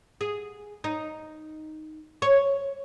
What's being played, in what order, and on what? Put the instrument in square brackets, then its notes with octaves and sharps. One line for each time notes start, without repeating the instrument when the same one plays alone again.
[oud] G#4
D#4
C#5